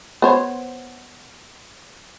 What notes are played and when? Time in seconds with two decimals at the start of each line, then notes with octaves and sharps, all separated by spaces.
0.22 B3 C5 C#5